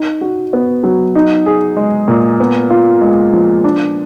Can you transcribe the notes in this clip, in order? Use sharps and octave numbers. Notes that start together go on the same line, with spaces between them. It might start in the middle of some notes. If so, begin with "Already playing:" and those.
Already playing: D#4
F#4
B3
F#3
D#4
G#4
G#3
A#2
B3
F4
G#3
F3
D4